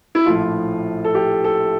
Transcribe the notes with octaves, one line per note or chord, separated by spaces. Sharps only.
E4
A#1 A2 F3 F4
A4
G4
A4